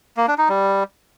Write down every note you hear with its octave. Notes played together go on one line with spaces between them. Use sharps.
A#3
D4
D#4
G3